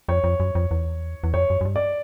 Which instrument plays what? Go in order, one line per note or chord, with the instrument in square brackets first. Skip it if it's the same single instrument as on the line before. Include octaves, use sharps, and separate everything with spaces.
[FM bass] F2 [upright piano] C#5
[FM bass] F2
F#2
F2
E2
E2
[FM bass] F2 [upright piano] C#5
[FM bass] F#2
F#2
G2
[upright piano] D5